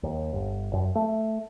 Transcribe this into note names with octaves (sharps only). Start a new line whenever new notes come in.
D#2
G1
F#2
A3